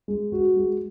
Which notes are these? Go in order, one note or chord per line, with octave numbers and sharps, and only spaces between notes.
G#3
F#4
G#3